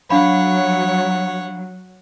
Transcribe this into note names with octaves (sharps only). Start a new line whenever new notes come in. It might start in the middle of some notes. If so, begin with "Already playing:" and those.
F#3 D4 C#5 F5 F#5 B5